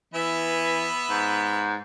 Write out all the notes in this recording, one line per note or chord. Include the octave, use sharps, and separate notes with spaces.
E3 B3 B4 E5
G#2